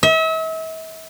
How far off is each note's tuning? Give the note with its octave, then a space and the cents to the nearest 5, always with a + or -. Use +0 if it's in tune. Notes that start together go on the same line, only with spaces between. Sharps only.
E5 -40